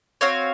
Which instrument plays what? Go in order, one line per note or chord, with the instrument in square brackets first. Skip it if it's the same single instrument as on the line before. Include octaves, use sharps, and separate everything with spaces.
[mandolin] C4 F#4 C#5 F5